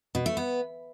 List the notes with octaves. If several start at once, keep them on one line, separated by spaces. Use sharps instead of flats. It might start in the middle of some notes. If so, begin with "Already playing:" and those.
B2
A3
B3